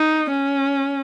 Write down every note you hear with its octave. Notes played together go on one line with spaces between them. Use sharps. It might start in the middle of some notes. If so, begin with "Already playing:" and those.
Already playing: D#4
C#4